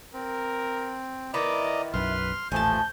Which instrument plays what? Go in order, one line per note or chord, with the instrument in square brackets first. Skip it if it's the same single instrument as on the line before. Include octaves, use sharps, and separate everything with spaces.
[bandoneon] C4 [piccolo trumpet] A#4
[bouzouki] D#3 B3 E4 [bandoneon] D5 D#5 A#5 [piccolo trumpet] D6
[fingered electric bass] B1 F#2 [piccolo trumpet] B4 [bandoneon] C6 F6
[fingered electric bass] D#1 A1 [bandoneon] F3 A3 [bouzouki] G#5 A5 [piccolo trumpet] G6